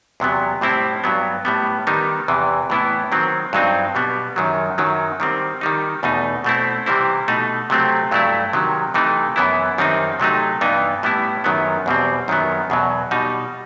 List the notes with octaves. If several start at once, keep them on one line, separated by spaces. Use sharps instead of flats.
E2 C3 F#3 B3
A2 G3 C4 E4
G2 F#3 B3
A2 G3 B3
D#3 G3 B3 D#4
E2 C3 E3
A2 E3 B3 E4
D#3 F#3 C4
G2 F#3 C4 D#4
B2 G3 B3
F#2 D#3 F#3
F#2 D#3 F#3
D#3 G3 C4
D#3 G3 D#4
E2 B2 A3 D#4
B2 A3 C4 E4
C3 E3 G3 C4 E4
B2 A3 D#4
C3 F#3 A3 C4
G2 F#3 A3 E4
C3 D#3 F#3
C3 E3 A3 D#4
F#2 E3 B3 E4
F#2 D#3 G3 C4 D#4
C3 F#3 A3 D#4
G2 E3 B3 D#4
A2 G3 B3 E4
F#2 D#3 F#3 B3
E2 B2 G3 C4
F#2 D#3 F#3 B3
E2 B2 F#3
B2 G3 D#4